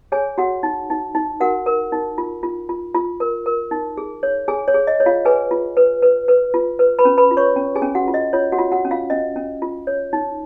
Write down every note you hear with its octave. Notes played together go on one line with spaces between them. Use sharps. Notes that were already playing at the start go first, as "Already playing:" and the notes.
G#4 C#5 G#5
F#4 F#5
D#4
D#4
D#4
F#4 A#4 F#5
A#4
D#4
F4
F4
F4
F4
A#4
A#4
D#4
G#4
C#5
G#4 G#5
C#5
G#4
D#5
C#5
F4 F5
G#4 B4 G#5
F4
B4
B4
B4
F4
B4
B4 B5
C#4
B4 B5
F4
C#5 C#6
C#4
G#4 G#5
C#4
F#4 F#5
F4
D#5
F4 C#5
F#4 F#5
F4
F#4 F#5
C#4
F4 F5
C#4 D#5
C#4
F4
C#5
D#4